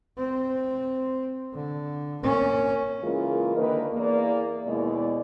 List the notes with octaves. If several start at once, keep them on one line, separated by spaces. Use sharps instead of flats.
C4
D3
A#3 C#4
C#3 E3 G#3 A#3 F4 A#4
D3 D#3 A#3 D#4 B4
E2 A#3 D5
D#2 B2 G#3 E4 D5